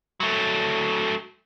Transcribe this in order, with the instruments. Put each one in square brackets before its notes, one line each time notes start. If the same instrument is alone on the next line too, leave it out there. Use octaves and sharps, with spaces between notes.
[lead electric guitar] F#3 A3